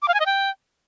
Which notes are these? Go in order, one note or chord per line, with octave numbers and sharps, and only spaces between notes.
D6
F5
G#5
D#5
G5